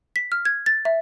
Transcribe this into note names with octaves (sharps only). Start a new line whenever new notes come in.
B6
F6
G#6
A6
E5